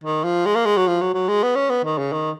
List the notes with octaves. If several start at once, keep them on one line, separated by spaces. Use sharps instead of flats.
D#3
F3
G#3
A#3
G#3
F#3
F3
F#3
F#3
G#3
B3
C#4
B3
D#3
C#3
D#3